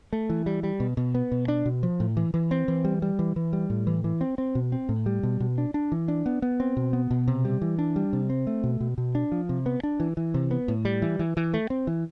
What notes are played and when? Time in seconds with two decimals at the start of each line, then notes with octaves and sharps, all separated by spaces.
0.13 A3
0.30 E3
0.46 G3
0.63 G3
0.80 B2
0.97 B2
1.14 B3
1.32 B2
1.48 D4
1.66 B2
1.83 F3
2.00 A2
2.17 E3
2.34 E3
2.51 C4
2.68 E3
2.85 G3
3.02 G3
3.19 E3
3.36 E3
3.53 G3
3.70 A2
3.87 E3
4.04 E3
4.21 C4
4.38 C4
4.55 B2
4.72 C4
4.89 A2
5.06 G3
5.23 B2
5.40 B2
5.58 D4
5.74 D4
5.92 E3
6.08 D4
6.26 B3
6.42 B3
6.60 C4
6.77 B2
6.93 B3
7.11 B2
7.28 C3
7.45 G3
7.62 E3
7.79 D4
7.96 G3
8.13 C3
8.30 C4
8.47 A3
8.64 B2
8.80 B2
8.98 B2
9.15 D4
9.32 F3
9.49 C3
9.66 B3
9.83 D4
10.00 E3
10.17 E3
10.34 C3
10.51 B3
10.68 A2
10.85 G3
11.02 E3
11.19 E3
11.37 E3
11.54 A3
11.70 C4
11.87 E3